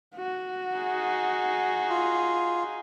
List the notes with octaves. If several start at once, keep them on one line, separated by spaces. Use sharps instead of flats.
F#4
D#4 G#4
F4